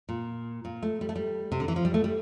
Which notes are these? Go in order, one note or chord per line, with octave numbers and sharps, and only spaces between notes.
A#2
A#2
A3
G3
A3
G3
C3
D3
E3
F3
G3
A3
G3